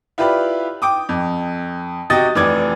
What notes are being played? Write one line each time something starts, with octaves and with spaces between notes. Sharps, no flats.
E4 F4 G4 B4 D5
G5 D6 D#6
F2
C3 F#4 D#5 G5 D#6 A6
F1 E3 D5 D6 G#6